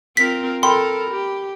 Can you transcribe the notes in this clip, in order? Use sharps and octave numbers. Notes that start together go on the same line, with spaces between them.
C4 F4 A#4 B6
A4 A#4 G5 B5 C6
G4